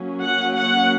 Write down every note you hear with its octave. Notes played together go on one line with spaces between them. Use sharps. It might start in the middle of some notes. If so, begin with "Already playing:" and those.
Already playing: F#3 A#3 C#4
F#5
F#5